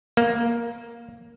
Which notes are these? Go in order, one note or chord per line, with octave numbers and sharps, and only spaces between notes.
A#3